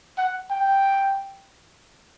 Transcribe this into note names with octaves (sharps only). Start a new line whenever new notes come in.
F#5
G5